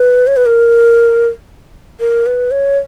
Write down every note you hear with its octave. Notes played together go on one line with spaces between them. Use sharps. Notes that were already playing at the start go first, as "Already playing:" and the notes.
Already playing: B4
C#5
B4
A#4
A#4
B4
C#5